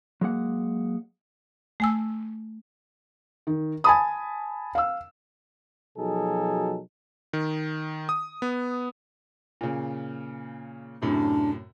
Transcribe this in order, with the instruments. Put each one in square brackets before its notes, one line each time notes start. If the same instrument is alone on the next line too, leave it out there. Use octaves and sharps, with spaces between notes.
[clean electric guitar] F#3 G#3 A#3 F#5
[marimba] A3 G#5 E6
[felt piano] D#3
G#5 A5 B5 D#6
F5 E6
[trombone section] B2 F3 F#3 D#4 G#4 A4
[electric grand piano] D#3
D#6
B3
[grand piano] A#2 C#3
[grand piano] F#2 A2 C3 [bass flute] D4